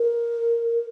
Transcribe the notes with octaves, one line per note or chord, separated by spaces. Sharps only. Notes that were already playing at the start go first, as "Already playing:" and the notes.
Already playing: A#4